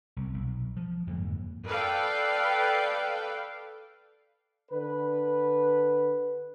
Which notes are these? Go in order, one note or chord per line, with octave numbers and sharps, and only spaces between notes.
C2
B1
F3
F2 G#2 D3 A#3
A4 B4 D5 F5 G5
D3 B4